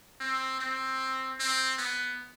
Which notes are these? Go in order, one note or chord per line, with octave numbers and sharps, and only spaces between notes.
C4
C4
C4
B3